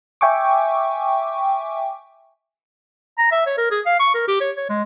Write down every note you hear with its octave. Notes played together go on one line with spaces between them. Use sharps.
E5 G5 G#5 C#6 D6
A#5
E5
C#5
A#4
G#4
F5
C#6
A#4
G4
C#5
C#5
G#3